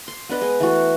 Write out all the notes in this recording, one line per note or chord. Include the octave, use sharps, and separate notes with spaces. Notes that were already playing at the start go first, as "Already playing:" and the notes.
C6
B3 D4 B4 D#5
G#3 G#4 D#5
E3 A3 F#4